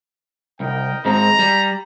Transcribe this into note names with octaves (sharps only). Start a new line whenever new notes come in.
C2 A#4 D#5 G5
G#2 G#3 C4 A#5
G3